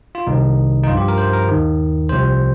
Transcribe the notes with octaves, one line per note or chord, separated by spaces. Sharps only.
F4
C2 C3 D#3 D#4
D#4
G2 F3 F4
G4
A#4
C5
A#4
D#2 D#3
C2 C3 F3 C5